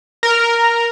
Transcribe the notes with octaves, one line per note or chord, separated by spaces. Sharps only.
A#4